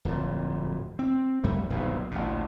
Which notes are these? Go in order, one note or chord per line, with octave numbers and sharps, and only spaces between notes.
D1 F2 A#2
C4
F2 G3 A3
D#1 B1 G2 A#2
A1 D2 A#2